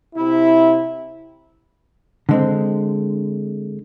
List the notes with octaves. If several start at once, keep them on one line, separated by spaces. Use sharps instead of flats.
C3 E4
D3 G#3 C4